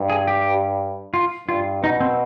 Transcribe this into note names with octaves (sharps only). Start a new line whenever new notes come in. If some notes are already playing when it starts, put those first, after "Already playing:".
Already playing: G2
G#4
G4
F4
G2 F4
B2 D#4
C4